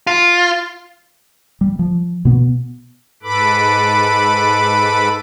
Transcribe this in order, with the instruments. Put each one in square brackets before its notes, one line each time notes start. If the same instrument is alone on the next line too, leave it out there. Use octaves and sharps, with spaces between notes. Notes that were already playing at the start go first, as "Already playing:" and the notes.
[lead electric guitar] F4
[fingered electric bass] G3
F3
B2 B3
[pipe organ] G#2 A4 B4 B5 D6